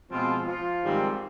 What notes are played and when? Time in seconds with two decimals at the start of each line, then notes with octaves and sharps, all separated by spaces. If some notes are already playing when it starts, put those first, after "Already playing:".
0.10 B2 F3 G#3 C4 F4
0.47 F3 F4
0.83 G#2 D#3 G3 C4